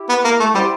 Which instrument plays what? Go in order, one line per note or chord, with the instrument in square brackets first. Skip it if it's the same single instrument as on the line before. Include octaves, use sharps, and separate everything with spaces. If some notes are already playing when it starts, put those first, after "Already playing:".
Already playing: [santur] E4 G4
[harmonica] B3
A#3
A3
[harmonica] G3 [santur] E4 G4 C5